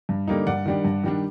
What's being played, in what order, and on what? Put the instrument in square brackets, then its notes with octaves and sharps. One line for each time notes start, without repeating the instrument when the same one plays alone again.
[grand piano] G2
D3 G3 A#3 D#4
G2 D5 F#5
D#3 G3 D4
G2
D#3 G3 D4